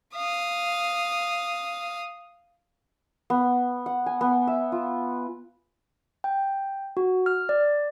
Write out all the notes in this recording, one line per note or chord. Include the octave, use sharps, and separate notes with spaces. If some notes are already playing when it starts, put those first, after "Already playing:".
F5 D#6
B3
F#5
G#5
B3
E5
F4
G5
F#4
F6
D5